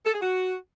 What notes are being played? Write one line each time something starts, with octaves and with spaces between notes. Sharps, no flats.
A4
G#4
F#4